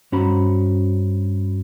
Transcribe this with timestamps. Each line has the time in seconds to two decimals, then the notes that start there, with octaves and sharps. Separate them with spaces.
0.12 G2 C#4 F#4 C5 A#5 B5